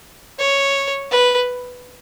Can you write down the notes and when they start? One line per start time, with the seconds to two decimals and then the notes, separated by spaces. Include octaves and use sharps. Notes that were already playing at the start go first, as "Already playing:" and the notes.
0.39 C#5
1.11 B4